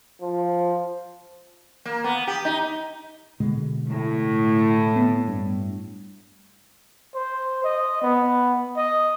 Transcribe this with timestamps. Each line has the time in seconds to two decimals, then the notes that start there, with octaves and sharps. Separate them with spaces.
0.21 F3
1.85 A#3
2.04 B3
2.27 G4
2.45 D#4
3.40 B2 D3 G#3
3.89 A2
4.96 B3
5.28 G2
7.15 C5
7.64 D#5
8.02 B3
8.77 D#5